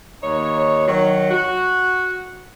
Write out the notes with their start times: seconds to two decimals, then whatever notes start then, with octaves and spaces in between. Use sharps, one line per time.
0.22 D#2 D#4 C#5
0.87 D#3 F#3
1.31 F#4